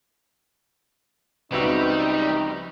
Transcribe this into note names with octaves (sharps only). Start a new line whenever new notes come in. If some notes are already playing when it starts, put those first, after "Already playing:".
C#2 G3 C4 D#4 F#4 B4 E5